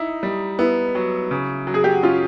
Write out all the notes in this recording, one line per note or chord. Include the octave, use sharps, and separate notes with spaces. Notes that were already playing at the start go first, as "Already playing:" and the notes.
Already playing: D#4 E4
G3
B3 E4
F#3
C#3
F#3
G#4
G4
F#4
C#4 F4